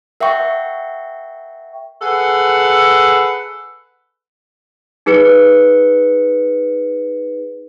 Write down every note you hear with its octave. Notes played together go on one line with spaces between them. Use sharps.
A#4 E5 F#5 G5 C#6
G#4 A4 B4 F#5
D#4 G#4 B4 C#7